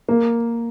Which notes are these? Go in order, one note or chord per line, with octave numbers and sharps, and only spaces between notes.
A#3